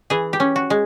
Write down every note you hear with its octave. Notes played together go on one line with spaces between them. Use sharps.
E3 G#4
G4
C#4
F#4
G#3